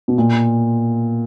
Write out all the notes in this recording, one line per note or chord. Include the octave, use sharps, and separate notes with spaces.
B2
A#2